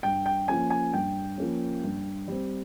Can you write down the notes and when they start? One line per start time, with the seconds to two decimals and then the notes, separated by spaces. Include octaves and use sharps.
0.03 G2 G5
0.26 G5
0.48 F3 A#3 C#4 G#5
0.70 G#5
0.93 G2 G5
1.38 F3 A#3 C#4
1.83 G2
2.28 G3 C4